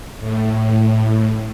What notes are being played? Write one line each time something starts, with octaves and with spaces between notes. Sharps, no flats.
A2